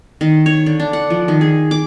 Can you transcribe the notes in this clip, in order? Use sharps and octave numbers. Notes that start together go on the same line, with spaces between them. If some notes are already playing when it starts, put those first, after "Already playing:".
D#3
C#5
D3
D4
F#5
F3
D#3
G#4
D6